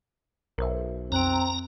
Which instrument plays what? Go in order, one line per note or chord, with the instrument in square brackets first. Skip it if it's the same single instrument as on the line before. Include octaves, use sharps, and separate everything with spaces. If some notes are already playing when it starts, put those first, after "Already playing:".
[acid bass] B1 [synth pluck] A#4 C5 E5
[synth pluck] F2 F#6 D7 [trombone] C4 [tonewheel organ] A#5